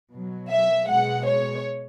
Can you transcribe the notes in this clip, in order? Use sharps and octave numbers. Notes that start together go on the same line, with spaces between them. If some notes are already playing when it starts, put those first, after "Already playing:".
B2 F#3
E5
B2 G#3 F#5
C#5